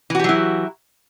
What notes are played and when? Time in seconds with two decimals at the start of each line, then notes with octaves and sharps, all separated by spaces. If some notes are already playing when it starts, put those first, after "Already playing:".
0.10 E3
0.15 F#4
0.19 G4
0.24 F#3
0.29 E4